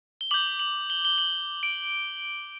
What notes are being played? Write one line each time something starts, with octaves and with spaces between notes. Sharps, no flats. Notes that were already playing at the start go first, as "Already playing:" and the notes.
G7
D6 G6 F#7
F#7
G7
G7
F#7
D7